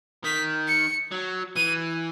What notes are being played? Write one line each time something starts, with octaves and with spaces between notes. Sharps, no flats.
D#3 B6
C#7
F#3
E3 D#7